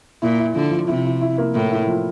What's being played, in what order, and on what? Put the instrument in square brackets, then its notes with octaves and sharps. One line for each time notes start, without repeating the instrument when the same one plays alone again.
[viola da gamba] A#2 [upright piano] E4
[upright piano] E4
[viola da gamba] D3 [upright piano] F3
[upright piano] F3
[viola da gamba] C3 [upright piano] E4
[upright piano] E4
E4
A#3
[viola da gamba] A2 [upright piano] E4
[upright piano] E4
F3